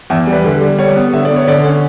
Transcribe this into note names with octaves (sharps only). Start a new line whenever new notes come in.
E2 E5
G3
B4
D3
G3
G3 C#5
B3
D3 E5
D5
B3
C#5
D3 D5
C#4